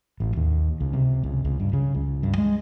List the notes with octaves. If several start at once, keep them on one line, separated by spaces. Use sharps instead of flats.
A1
D#2
C#2
C3
C#2
C#2
G2
C#3
C#2
G2
G#3